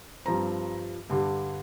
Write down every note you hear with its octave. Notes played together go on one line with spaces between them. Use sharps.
G2 F3 C4 A#5
G2 D3 G3